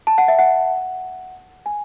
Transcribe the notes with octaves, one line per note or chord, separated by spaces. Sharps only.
A5
F#5
E5
F#5
G#5